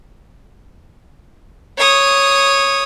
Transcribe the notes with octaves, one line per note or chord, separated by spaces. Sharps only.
C#5 D#6